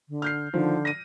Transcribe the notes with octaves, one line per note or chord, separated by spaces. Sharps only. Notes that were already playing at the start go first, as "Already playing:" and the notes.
D3
F6 G6 C7
D3 D#3 F3
A#6 D#7